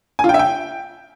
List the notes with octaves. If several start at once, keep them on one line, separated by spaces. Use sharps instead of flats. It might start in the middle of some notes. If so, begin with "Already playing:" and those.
G#5
F4
G5
E5
G5